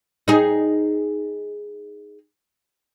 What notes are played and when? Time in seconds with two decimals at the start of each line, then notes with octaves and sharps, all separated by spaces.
0.28 D#4 G#4